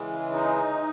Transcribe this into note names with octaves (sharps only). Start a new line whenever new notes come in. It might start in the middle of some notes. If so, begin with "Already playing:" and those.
Already playing: C#3 E3 G#3
D#4